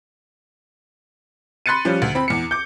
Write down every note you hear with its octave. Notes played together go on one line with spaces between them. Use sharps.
B5 C6 F#6 A6 C#7 D#7
F3 G3 C#4
D2
C4 B5
E2 C#7
D6 G6